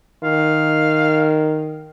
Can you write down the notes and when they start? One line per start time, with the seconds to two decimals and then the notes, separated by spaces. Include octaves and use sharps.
0.23 D#3 F5